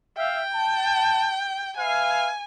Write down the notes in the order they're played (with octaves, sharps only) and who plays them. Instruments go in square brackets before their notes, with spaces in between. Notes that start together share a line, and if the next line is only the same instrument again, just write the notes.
[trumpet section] E5 F5 [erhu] G5
[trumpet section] A5
[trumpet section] B4 E5 F5 [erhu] G#5